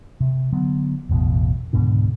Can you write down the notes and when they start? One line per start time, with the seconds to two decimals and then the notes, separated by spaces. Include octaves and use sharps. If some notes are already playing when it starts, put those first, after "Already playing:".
0.20 C3
0.52 D3 F#3 B3
1.09 E1 A1 B2
1.73 C#2 G#2 B2 D3